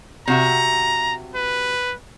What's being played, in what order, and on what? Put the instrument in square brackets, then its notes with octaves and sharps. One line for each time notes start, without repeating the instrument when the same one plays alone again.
[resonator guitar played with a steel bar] C3 F#4 E5 [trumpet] A#5
[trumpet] B4